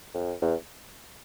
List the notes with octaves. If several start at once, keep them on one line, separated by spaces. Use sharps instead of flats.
F2
E2